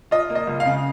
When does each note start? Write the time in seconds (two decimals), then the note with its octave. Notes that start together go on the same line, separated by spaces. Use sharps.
0.11 F4 D#5
0.30 A#3
0.35 D#5
0.47 C#2
0.60 F5
0.65 C#3